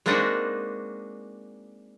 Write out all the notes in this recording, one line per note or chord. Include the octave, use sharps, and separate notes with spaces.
G#3 A#3 C4 D4 D#4 F#4